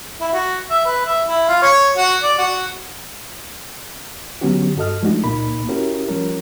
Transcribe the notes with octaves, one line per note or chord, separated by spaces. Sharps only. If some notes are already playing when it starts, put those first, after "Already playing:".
E4
F#4
E5
B4
E5
E4
F4
C#5
F#4
D5
F#4
D3 F#3 B3 C#4 F#4 G4
G2 F#4 A4 D#5 F6
F3 G#3 A3 D4 D#4 F#4
C#2 A#2 A#3 D#4 B5
C#4 E4 F#4 G4 A#4
F3 G3 C#4 A#4